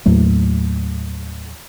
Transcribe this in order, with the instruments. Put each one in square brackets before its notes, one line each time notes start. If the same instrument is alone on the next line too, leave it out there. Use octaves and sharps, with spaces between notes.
[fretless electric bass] D#2 A2 F#3 A3